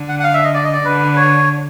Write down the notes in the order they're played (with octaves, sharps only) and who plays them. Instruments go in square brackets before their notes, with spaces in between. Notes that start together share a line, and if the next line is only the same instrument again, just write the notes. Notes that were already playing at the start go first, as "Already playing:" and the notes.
Already playing: [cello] D3
[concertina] F#5
F#5
F5
E5
D#5
D5
D#5
D5
[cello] D3 [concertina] B4
[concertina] C#5